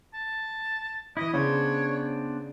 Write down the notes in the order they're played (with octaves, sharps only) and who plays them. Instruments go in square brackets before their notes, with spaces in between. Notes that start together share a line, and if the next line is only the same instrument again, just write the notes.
[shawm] A5
[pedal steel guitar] E3 E4 [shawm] D#5
[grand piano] C#3 [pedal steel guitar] B3 D4 C5 [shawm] C#5